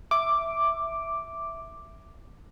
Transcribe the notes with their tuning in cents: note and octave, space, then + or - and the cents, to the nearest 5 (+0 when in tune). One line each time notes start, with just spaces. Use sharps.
E5 +0 D6 +0